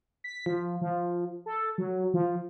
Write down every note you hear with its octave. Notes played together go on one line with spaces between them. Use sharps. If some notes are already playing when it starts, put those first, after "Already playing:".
B6
F3
F3
A4
F#3
F3